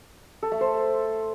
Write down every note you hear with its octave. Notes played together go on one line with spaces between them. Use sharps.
A4
A3
C5